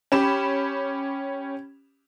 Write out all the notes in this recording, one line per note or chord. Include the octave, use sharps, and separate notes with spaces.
C#4 G4 B5 E7